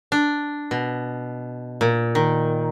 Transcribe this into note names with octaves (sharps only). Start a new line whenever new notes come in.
D4
B2
A#2
D#3